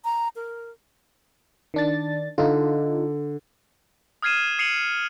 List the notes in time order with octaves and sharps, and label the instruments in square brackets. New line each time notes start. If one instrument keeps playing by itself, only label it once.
[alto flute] A#5
A#4
[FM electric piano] D#3 D4 A6
[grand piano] D3 [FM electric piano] D#4 F4
[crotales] D#6 F6 G#6 C7 D#7 E7
D#6 C7 C#7 D#7 F7 F#7